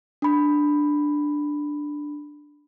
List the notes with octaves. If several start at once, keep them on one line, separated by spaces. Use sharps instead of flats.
D4 B5